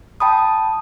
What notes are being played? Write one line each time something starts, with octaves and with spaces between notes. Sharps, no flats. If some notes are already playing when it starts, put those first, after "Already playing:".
G5 A5 B5 D#6